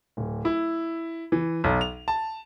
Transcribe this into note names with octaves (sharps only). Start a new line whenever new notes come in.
D1
E4
E3
B1
F7
A5